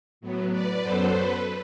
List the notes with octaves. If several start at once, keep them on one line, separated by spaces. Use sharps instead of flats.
A2 F#3 B3
B4 D5
F#2 F#3 B3 A4 C5
B4